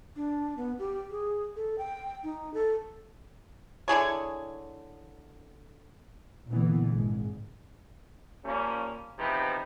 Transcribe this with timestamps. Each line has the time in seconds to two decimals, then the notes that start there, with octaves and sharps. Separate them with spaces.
0.16 D4
0.57 B3
0.79 G4
1.11 G#4
1.56 A4
1.78 G5
2.24 D#4
2.54 A4
3.88 D3 E4 G#4 C#5
6.49 A#2 D3 E3 B3
6.88 G#1 G#3
8.45 F3 G3 A#3 C#4
9.19 E2 C3 F3 D#4 G4 B4